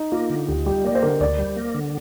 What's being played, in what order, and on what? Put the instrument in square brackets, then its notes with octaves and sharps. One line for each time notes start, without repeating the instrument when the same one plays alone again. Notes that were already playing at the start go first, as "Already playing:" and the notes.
Already playing: [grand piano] D#4
[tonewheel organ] A#3 [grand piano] F4
[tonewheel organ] D3
[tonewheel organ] D2 [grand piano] G4
[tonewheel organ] G3 [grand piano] G4
[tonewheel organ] A#3 [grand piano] D5
[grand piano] C5
[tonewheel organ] D3 [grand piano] A#4
[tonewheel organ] D2 [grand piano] D5
[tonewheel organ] G3
A#3
D3